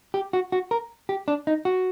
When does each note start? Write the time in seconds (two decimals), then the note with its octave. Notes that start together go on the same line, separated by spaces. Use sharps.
0.14 G4
0.33 F#4
0.52 F#4
0.71 A#4
1.09 G4
1.28 D4
1.47 D#4
1.65 F#4